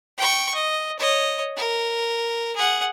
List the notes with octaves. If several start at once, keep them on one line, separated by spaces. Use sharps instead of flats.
G5 C#6
D#5
C#5 D#5
A#4
G#4 F#5